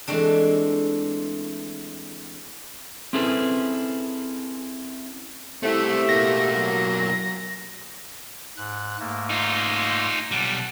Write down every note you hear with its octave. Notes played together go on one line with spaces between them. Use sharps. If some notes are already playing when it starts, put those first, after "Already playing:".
E3 G#3 A3 C4 D4
C4 C#4 E4 G#4 A4 B4
A3 C4 E4 G4 E5
B2 A#3 A#6
F#3
G#2 F#6
G#2 A3 A#3
D#4 F4
B1 G3 F#5 A5